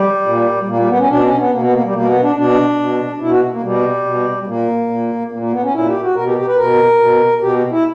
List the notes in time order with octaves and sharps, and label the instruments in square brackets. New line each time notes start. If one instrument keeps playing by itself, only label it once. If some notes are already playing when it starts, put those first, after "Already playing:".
Already playing: [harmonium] G3
A#2
A#2 A#3
G3
B3
C#4
B2 D4
C#4
B3
B2 A#3
B3
A#3
G3
B2 A#3
B3
D4
B2 D4
B2
B2 E4
F#4
A#3
B2 G3
B2
A#2 A#3
A#2
A#2 A#3
A#3
B3
C#4
A#2 E4
G4
F#4
B2 A#4
G4
G4
B4
B2 A#4
B2
B2 G4
E4